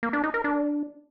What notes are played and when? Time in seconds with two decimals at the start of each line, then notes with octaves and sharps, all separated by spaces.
0.03 A#3
0.13 D4
0.24 D#4
0.34 A#4
0.44 D4